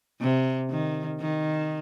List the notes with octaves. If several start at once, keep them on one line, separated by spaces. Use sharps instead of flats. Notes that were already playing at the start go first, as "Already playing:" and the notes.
C3
D#3
D#3